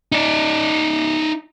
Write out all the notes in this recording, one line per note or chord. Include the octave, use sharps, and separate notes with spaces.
D#4 D5